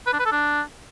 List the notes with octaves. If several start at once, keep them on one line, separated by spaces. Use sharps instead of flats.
B4
D4
B4
A4
D4